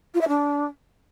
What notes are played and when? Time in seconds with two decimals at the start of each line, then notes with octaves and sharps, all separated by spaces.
0.14 F4
0.21 E5
0.28 D4